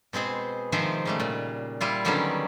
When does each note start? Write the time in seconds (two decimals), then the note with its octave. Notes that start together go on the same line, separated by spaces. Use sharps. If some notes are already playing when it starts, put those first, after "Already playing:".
0.13 B2 G#3 C4 G#4 C5
0.72 C3 D#3 F3 G#3 C5 E5
1.05 C#3 G3 A3
1.20 A#2
1.81 G3 E4 F4
2.05 D3 D#3 F#3 G3 B3 C#4